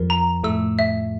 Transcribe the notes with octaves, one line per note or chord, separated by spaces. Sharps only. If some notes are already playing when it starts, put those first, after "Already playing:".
Already playing: F2 F3 A#4
A#5
A2 A3 E6
E5